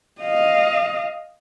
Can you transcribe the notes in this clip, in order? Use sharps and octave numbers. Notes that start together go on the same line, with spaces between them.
D#5 F5